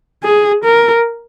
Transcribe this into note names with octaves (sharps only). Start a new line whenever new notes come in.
G#4
A#4